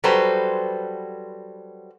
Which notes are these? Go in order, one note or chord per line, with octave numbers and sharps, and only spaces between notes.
F#3 G3 F#4 A4 B4 C5